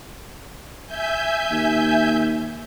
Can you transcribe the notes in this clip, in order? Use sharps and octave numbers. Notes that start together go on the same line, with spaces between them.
E5 G#5 G6
D#2